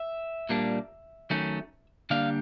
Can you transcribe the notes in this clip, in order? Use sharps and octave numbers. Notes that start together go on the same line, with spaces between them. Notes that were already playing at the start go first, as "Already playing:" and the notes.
Already playing: E5
A#2 G3 A#3 D4
D#3 F#3 A3 C#4
D3 G3 A#3 D4 F5